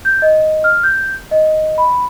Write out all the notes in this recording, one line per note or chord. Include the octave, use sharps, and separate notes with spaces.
G6
D#5
F6
G6
D#5
B5